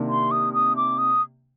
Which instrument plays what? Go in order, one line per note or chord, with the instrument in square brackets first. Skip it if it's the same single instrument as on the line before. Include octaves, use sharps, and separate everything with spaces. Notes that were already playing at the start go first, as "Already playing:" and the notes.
Already playing: [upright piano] C3 D#3 A#3 D4
[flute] C6
D#6
D#6
D6
D#6